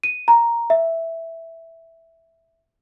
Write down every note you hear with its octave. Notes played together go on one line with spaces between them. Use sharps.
D#7
A#5
E5